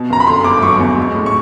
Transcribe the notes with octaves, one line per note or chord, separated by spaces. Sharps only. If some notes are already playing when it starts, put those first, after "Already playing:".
Already playing: B2
F#1 A#5
B5
D3 C6
G1 D6
F#3 C#6
E2
G#3
A2
C#6